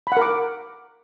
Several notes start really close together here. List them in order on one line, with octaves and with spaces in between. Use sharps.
B5 F#5 A#4 D6